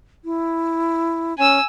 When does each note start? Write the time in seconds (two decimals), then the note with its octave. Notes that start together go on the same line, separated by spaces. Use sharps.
0.25 E4
1.38 C#4 G#5 E6